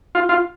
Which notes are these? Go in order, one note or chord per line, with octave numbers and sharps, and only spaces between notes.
F4
F4